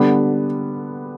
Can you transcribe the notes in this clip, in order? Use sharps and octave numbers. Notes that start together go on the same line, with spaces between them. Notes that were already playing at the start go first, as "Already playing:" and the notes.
Already playing: D3 G3 B3 D4